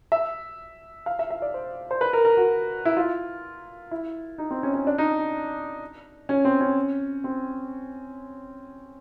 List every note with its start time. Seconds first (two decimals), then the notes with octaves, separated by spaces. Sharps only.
0.12 E5
1.06 F5
1.19 E5
1.30 E5
1.42 D5
1.54 C5
1.91 C5
2.01 B4
2.13 A#4
2.25 A#4
2.37 F#4
2.85 E4
2.97 F4
3.91 E4
4.38 D#4
4.51 C4
4.63 C#4
4.74 C#4
4.87 D4
4.98 D#4
6.29 C#4
6.45 C4
6.61 C#4
7.24 C4